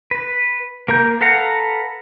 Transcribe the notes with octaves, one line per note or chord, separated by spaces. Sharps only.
B4
A#3 A#4 A#5 G6
A4 B4 F5 F#5 A#5